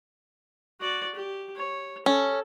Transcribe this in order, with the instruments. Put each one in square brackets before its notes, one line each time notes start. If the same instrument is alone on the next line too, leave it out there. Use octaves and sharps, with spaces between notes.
[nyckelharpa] F#4 D5
G4
C#5
[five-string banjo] C#4 [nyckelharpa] A4